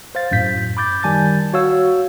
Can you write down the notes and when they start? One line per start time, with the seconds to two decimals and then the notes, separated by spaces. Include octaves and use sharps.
0.15 C5 F5 A6
0.31 F#2 A2 G6 B6
0.77 B5 D6 G6 A6
1.03 D#3 G3 G#5 A5 G6 A6
1.53 F#4 C#5 F5 E6